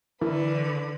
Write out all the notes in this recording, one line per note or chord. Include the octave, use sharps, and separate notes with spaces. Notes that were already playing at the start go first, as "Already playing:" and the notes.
D3 E3 E4 A#4 B4